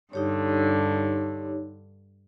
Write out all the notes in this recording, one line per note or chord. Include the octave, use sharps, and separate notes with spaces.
G2 D3 D#4 G4 C#5